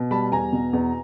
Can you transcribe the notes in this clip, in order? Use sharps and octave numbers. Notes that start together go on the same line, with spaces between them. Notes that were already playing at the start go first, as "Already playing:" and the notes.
Already playing: B2
G3 A5 B5
E2 G#5 A#5
B2
E2